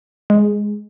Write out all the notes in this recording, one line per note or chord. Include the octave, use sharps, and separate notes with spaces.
G#3